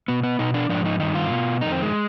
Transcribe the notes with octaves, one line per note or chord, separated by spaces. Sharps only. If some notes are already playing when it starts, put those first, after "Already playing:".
B2 B3
B3
B2 D#4
D4
G#2 F3 D4
D#4
G2 D#3 D#4
F4
B2
F2 D#3 D#4
C4
G#3